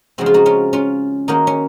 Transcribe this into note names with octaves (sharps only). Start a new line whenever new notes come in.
C#3 F3 G#3 C4 F#4
F4
D#4 F#4
C#4 F4
C#4 F4
D#3 A#3 C#4 D#4 F#4
C#4